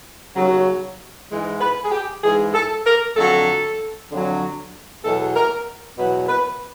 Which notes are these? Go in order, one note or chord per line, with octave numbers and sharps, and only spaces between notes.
D#2 C#3 F#3
G#2 E3 G#3
B4
G#4
G4
G#2 E3 G#3 G#4
A4
A#4
F2 D3 F#3 A4
F2 D3 F#3
E2 B2 F#3 A4
A#4
E2 B2 F#3 B4
B4